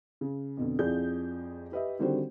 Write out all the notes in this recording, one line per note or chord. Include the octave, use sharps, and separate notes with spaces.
C#3
F2 B2 D3
F2 F3 E4 G#4 D5 G6
G4 B4 D#5 E5
D3 D#3 G3 C4 F#4 C5